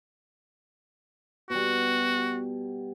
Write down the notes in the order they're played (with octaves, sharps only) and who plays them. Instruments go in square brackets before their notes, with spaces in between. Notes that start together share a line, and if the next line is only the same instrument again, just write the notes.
[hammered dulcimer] B2 G3 [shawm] F#4